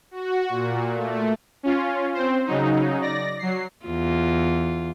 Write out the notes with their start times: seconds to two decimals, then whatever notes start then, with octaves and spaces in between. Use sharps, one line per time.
0.11 F#4
0.49 A#2
0.95 A3
1.63 C#4 F4
2.14 C4 C5
2.46 C#3 F#3 D#4
3.01 D5 A#6
3.39 F#3 C7
3.85 E2 F4